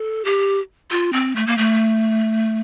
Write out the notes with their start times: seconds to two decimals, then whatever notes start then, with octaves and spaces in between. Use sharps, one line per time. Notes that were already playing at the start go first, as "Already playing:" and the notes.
Already playing: A4
0.25 G4
0.91 F4
1.13 C4
1.36 A3
1.47 A#3
1.58 A3